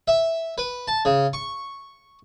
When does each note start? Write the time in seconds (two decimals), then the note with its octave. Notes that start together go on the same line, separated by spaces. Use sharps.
0.08 E5
0.58 B4
0.88 A5
1.05 C#3
1.33 C#6